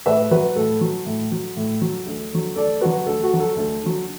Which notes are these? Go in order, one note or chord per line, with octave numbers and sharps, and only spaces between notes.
A2 B4 E5
F#3 F#4 B4
A2 A4
F#3
A2
F#3
A2
F#3
D2
D3 F#3
D2 A4 D5
D3 F#3 F#4 B4
D2 A4
F#4
D3 F#3
A4
D2
D3 F#3